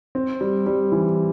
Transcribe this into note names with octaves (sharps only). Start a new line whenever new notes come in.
C4
G3
G3
E3